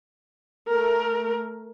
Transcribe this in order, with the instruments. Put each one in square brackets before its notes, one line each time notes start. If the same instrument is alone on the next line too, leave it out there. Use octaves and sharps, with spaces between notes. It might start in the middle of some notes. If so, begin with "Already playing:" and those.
[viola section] A3 A#4